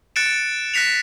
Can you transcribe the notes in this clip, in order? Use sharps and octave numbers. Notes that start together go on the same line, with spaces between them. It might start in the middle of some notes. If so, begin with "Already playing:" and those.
F#6 A6 C#7 D7 E7
F#6 A#6 B6 C#7 F7